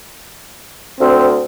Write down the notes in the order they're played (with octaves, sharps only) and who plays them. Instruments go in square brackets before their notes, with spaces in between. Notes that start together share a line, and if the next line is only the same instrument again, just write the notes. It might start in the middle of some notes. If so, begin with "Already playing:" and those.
[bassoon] D2 [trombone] C4